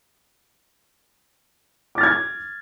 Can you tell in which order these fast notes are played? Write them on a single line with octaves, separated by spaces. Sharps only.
D6 A6 F6 G#6